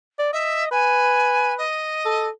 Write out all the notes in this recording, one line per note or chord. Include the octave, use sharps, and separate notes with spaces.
D5
D#5 E5
B4 G#5
D#5
A4